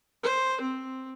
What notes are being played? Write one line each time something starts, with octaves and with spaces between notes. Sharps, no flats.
C5
C4